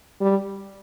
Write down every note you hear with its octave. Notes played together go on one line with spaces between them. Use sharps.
G3